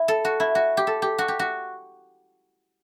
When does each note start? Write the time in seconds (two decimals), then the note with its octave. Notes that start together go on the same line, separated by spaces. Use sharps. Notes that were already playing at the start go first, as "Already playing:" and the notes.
Already playing: E4
0.08 A4
0.25 F#4
0.40 E4
0.55 F#4
0.77 G4
0.87 A4
1.02 G4
1.18 F#4
1.28 G4
1.39 F#4